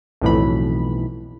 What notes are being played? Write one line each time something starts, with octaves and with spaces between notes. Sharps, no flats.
B1 F2 A2 E3 B5